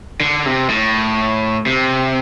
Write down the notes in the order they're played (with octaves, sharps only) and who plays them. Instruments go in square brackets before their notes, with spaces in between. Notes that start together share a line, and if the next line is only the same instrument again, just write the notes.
[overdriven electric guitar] D3
C3
A2
C3